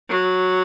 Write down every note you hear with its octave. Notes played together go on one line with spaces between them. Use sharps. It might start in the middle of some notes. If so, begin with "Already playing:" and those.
F#3